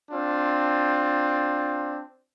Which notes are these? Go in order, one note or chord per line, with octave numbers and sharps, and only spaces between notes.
C4 D4 F4